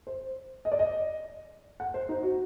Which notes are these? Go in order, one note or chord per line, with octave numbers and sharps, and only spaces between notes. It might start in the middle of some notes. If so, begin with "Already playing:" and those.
C5
D#5
D5
D#5
F#5
C5
D#4
F#4